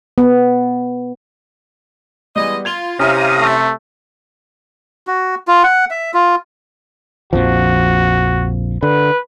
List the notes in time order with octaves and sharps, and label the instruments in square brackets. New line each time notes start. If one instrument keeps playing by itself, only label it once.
[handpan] B3
[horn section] E3 G#3 D#5 [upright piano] G3 B3
[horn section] F4 [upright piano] G#6 F7 G7
[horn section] C3 [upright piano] C#4 E4 [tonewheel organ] F5 A#5 D#6
[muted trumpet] A3
[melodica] F#4
F4
F#5
E5
F4
[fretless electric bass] A#1 F2 F3 [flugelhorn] F#4
[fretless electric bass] D3 [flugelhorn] B4